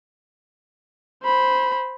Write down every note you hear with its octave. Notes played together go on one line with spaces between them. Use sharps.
C5 B5